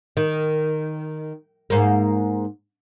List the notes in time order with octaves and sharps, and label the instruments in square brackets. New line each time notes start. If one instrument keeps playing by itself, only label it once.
[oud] D#3
G#2 A#3